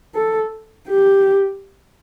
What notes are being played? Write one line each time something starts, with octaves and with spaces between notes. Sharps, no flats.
A4
G4